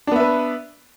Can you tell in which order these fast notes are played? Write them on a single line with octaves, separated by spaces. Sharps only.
D4 B3 E5 B4